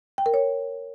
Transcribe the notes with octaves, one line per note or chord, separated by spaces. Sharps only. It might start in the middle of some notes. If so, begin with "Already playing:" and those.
G5
A#4
C#5